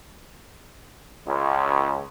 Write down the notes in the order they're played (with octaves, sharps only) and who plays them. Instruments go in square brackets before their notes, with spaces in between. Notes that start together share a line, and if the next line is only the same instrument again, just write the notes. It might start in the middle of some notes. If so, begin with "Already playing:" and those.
[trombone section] C#2